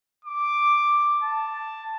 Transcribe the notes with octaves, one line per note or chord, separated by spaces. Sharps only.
D6
A5